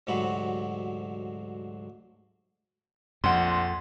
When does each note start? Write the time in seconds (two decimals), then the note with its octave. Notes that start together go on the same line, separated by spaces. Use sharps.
0.07 D2 G#2 C3 F#3 F#4 B5
3.24 A#1 F2 F#5 C6